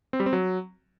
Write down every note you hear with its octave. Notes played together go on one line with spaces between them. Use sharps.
C4
G3
C4
F#3